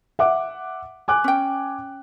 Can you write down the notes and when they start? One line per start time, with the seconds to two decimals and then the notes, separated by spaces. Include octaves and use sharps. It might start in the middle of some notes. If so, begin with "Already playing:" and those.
0.19 E5 F#5 D6
1.08 G#5 D6 F#6
1.24 C#4 G5